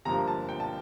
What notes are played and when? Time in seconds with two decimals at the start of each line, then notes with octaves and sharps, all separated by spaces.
0.05 G1 G2 F3 A#3 A#5
0.27 A5
0.49 G5
0.60 A5